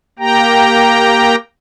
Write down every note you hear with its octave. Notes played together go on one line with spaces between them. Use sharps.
A#3 G4 G5 A#5